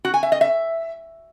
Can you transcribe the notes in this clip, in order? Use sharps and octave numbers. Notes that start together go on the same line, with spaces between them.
F#4
G#5
E5
D#5
E5